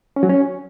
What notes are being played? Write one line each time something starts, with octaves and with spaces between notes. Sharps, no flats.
C#4
F#3
C#4